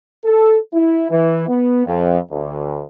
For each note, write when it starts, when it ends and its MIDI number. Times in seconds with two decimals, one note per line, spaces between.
0.25 0.57 69
0.73 1.08 64
1.10 1.45 52
1.48 1.85 59
1.86 2.18 41
2.31 2.83 38